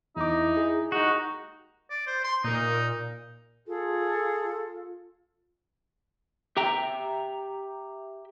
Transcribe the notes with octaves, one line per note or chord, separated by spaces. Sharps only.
E2 D#4 E4 D6
G#4
G#3 A#3 D#4 F#4 G4
D5
C5
C6
A#2 D#4 A#4
F4 G#4 A4
G4 E5 G5 A#5